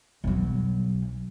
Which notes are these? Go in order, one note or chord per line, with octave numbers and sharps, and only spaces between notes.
B1 F#3